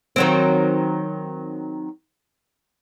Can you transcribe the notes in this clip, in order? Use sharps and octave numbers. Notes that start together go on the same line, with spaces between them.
D#3 F#3 C4